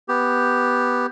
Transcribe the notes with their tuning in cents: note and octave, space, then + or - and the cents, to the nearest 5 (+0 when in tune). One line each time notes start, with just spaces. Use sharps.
B3 +0 G4 +0